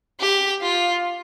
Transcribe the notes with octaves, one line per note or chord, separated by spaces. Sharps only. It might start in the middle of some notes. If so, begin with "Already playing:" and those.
G4
F4